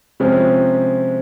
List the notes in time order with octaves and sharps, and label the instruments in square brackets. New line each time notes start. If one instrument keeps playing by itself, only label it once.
[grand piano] C3 F3 G#3 C#4